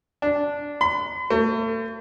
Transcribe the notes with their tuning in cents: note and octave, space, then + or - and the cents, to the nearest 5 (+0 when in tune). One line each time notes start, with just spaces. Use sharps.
D4 -10
B5 +45
A3 +40